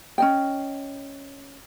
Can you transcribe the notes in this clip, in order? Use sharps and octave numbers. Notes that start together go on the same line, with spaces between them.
C#4 D#5 G5